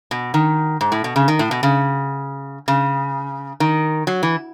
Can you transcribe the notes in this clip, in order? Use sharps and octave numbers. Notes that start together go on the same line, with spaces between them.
B2
D#3
G#2
A2
B2
C#3
D#3
A2
B2
C#3
C#3
D#3
F#3
E3